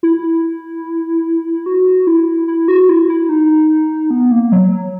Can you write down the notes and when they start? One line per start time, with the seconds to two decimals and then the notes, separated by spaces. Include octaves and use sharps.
0.03 E4
1.66 F#4
2.07 E4
2.48 E4
2.68 F#4
2.89 E4
3.09 E4
3.29 D#4
4.11 B3
4.31 A#3
4.52 F#3
4.72 F#3